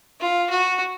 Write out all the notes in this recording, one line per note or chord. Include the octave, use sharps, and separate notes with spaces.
F4
F#4